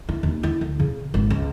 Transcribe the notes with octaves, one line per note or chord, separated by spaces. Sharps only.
E4
D#2
E4
D2
C#3
G#1
C#2